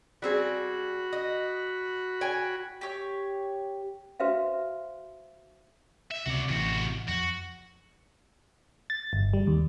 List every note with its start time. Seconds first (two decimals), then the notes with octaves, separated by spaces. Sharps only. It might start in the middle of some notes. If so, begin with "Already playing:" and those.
0.22 G3 C4 F#4 G#4 B5
1.12 D#5
2.21 C#5 G5 G#5
2.81 G4 C#5
4.20 F#4 B4 C5 E5 F5
6.11 E5
6.26 C#2 C3 F#4 D5
6.49 A1 C3 E3 F#4
7.08 F2 F#4
8.90 A6
9.13 G1
9.34 G3
9.47 D#2